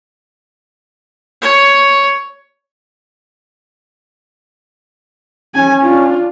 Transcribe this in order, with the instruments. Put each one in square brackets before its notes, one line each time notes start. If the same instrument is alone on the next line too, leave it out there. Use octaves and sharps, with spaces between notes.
[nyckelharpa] C#5
[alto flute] C#4 [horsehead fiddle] G#5
[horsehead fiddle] D4 F4